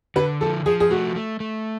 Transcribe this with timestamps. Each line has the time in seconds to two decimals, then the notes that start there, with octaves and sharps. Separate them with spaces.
0.16 D3 B4
0.41 F3 A4
0.66 F3 G#4
0.80 G#4
0.91 A3 F#4
1.16 A3
1.40 A3